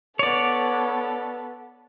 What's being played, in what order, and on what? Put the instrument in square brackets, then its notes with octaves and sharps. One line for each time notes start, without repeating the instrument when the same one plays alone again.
[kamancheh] B3 A4 [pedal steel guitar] C#5 D5